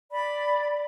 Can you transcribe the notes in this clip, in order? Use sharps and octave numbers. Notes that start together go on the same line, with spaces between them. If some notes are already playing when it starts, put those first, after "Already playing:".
D5 B5